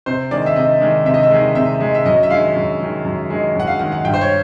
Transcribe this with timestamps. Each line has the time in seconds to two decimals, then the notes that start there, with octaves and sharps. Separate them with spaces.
0.06 C3 C5
0.31 D#3 G#3 D5
0.46 E5
0.56 C3 D#5
0.81 D#3 G#3
1.05 C3 E5
1.14 D#5
1.23 E5
1.31 D#3 G#3
1.55 C3 E5
1.81 D#3 G#3
1.95 E5
2.05 F#2 D#5
2.23 E5
2.30 D#3 G#3 F5
2.55 F#2
2.80 D#3 G#3
3.05 F#2
3.29 D#3 G#3
3.55 F#2 F#5
3.67 F5
3.79 D#3 G#3 F#5
3.92 F#5
4.05 G2 G5
4.14 C5
4.21 C#5